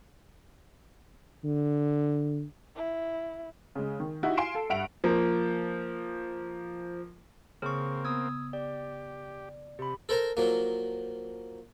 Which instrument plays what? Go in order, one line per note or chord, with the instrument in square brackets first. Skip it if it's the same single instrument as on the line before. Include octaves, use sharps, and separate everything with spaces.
[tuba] D3
[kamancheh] E4
[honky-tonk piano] C#3 G#3
D#3
D#4 E4 F#4 G4
F5 G#5 C6 C7 D7 E7
A4
G2 E5 F#5 D7 F7
[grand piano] F3 A#3
[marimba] C#3 [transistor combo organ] A#3 C4 [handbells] G#4 C#6
[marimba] B3 [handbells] D#6 E6 G#6
[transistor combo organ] G4 [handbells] D5
[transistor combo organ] C3 [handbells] G4 B5
[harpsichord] A4 A#4 C5 A5 A#5
F3 F#3 A#3